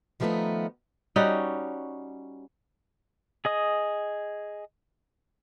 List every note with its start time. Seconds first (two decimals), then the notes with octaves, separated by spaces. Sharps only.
0.20 D#3 F3 G3 A3 B3 D#4
1.16 G3 C#4 D#4 F#4
3.45 G#4 D#5 D#6